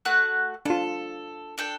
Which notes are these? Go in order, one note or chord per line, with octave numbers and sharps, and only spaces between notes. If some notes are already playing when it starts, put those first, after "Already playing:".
A3 F#4 F#6
D4 F4 A4
D4 A4 G5